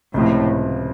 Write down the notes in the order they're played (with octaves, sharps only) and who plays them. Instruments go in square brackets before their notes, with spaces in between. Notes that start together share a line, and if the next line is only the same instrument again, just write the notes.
[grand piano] C#2 C3 F3 [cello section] A2